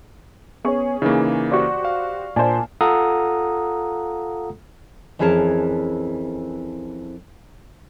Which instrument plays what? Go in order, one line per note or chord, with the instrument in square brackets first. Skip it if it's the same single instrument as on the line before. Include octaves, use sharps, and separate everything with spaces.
[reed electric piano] B3 C#5 [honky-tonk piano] C#4 G#4 C#6
[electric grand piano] C#3 E3 A#3 [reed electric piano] D#4
[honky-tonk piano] F#4 G4 C5 [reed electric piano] D5 C#6
[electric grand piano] F5
[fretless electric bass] A#2 [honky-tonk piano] D4 C5 [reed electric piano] G#5 A5
[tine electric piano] F4 A4 F5 F#5 A#5 D#6
[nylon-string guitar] F2 E3 C#4 G#4 A#4 A5